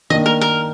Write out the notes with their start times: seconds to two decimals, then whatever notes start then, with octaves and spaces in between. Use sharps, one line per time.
0.10 D#3 A#3 D4 D#5
0.26 A#4
0.41 A#4